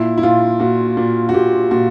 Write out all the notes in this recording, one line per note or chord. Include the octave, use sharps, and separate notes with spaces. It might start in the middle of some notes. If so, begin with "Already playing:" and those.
Already playing: A#2 E4
E4
A#2 F4
A#2 F#4
A#2
F#4
A#2 G4
A#2 F#4